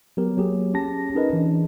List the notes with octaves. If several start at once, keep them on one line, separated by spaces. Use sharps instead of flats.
F#3 B3 G4 A#4
F#3 A#3 G4 G#4
C#4 G4 A5 A#6
C#4 D#4 G#4 A#4 B4 D#5
E3 D4